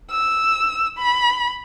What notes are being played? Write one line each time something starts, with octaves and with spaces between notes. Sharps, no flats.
E6
B5